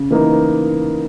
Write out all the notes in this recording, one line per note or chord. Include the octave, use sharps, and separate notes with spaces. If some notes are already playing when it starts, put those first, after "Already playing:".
Already playing: C#3
E3 A#3 D#4 A#4